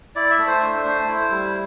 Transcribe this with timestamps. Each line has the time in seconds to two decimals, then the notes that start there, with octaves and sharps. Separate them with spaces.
0.15 E4 D5
0.30 E5
0.38 A3
0.47 C5
0.62 D4
0.85 A3
1.07 E4
1.30 G3